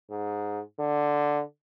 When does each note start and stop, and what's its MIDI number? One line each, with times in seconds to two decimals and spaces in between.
0.10 0.61 44
0.79 1.43 50